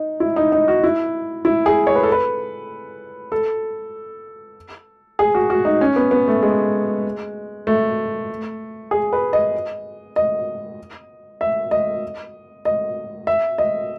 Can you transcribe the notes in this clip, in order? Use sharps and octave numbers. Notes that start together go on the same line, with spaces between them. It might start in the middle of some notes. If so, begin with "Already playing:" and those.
Already playing: D#4
E4
D#4
D#4
F#4
E4
E4
G#4
C#5
B4
A4
B4
A4
G#4
F#4
F#4
D#4
C#4
B3
B3
A3
G#3
A3
G#4
B4
D#5
D#5
E5
D#5
D#5
E5
D#5